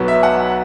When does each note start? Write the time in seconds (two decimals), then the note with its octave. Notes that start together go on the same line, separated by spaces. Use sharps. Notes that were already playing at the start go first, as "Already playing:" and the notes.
Already playing: B1 B2 F#3 B3
0.08 E5
0.23 F#5